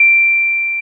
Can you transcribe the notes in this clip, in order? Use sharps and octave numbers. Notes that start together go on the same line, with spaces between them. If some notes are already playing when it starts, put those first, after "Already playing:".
Already playing: D7